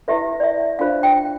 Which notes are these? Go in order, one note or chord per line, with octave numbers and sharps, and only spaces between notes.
E4 G4 B4 E5
D5
E5
D4 F4 C5 F5
G5